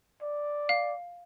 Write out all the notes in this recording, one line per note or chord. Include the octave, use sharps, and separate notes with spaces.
D5
F5